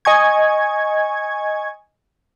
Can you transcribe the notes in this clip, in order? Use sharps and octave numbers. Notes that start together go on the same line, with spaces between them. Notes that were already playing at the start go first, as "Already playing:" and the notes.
D#5 G#5 C#6 G#6